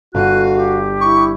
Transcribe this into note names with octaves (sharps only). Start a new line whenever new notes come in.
G1 F#4 F5 F#6 D#7
G4
E4 C#6